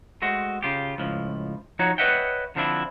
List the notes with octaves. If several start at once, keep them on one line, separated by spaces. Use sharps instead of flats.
G#3 A3 F#4 C5
C#3 F4 G4
C#2 A2 F3
F3 D#4 F#4 C#5
B4 C#5 D#5 E5 F#5 G5
D3 F3 C4 D4 E4